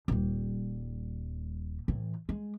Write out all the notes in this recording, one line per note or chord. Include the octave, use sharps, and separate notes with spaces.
D#1 G3
A2 E3
G#3